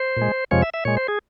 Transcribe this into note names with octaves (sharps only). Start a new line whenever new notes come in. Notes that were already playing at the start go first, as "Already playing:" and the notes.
Already playing: C5
A#2 G#3
F2 C3 F3 G#3 C#5
E5
E5
A#2 G#3 C#5
C5
G#4